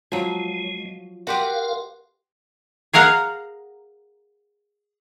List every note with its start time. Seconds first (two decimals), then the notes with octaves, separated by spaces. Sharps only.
0.12 F3 F#3 G#3 F4
1.27 F#4 G4 A#4 B4 F5 F#5 C6
2.93 G#4 A#4 F5 F#5 A#5